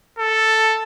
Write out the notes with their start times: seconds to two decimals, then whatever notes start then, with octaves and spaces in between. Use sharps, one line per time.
0.19 A4